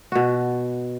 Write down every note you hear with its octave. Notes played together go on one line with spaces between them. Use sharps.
B2 F#4